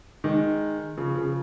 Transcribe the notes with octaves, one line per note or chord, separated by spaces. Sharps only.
D#3 G#3
C#3 F3
C#3 F3